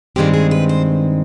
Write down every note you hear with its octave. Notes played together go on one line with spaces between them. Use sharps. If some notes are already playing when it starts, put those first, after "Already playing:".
G2 D#3 G#3 C4 G4
G#4
B4
C5